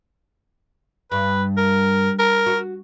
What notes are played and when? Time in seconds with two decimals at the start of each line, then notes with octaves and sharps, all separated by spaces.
1.12 G2 B4
1.57 A#4
2.19 A#4
2.46 F#4